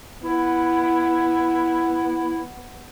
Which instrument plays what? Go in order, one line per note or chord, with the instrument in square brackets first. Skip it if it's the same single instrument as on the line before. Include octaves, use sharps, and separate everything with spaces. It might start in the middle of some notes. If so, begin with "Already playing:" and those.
[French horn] B3 [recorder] E4